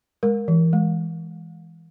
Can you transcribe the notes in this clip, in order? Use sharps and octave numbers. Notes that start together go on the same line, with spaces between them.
G#3 A#4
E3
G#3